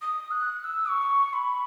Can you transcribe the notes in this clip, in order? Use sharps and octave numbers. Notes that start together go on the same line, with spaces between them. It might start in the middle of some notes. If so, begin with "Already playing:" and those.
D#6
F#6
F#6
E6
C#6
B5